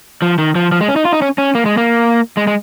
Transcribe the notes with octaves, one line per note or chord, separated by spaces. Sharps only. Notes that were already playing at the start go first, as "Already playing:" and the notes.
F3
D#3
F3
F3
G#3
C#4
D#4
F4
D#4
C#4
C#4
A#3
G#3
A#3
G#3
G#3